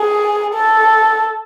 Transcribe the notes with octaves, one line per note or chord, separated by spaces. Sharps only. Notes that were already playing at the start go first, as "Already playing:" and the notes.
Already playing: G#4
A4